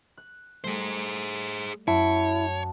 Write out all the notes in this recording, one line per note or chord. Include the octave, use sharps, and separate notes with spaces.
F#6
G3 A3 G#4 C5
F#2 E4 C#5 A5